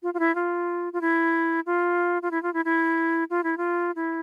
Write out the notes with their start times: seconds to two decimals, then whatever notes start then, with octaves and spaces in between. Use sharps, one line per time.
0.03 F4
0.14 F4
0.19 E4
0.35 F4
0.93 F4
1.01 E4
1.66 F4
2.22 F4
2.31 E4
2.43 F4
2.54 E4
2.65 E4
3.30 F4
3.44 E4
3.57 F4
3.96 E4